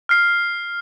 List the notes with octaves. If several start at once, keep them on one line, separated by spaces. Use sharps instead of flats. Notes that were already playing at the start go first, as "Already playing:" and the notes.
F6 C7